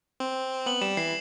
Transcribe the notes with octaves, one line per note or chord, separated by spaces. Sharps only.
C4
B3 F#7
G3 E7
E3 C7